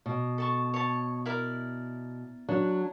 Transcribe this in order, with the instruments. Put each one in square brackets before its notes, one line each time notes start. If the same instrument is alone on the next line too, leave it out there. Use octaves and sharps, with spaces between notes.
[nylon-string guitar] B2
[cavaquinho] A4 A5 C#6
C#5 A5
E4 A#4 D5
[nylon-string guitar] F#3 D4